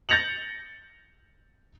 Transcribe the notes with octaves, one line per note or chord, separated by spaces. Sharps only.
G6 A6 A#6 C#7 F7 F#7